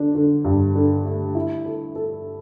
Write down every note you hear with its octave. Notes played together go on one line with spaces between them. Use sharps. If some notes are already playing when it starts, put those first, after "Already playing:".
Already playing: D3 D4
D3
G2
D3
A3
E4
A4
A4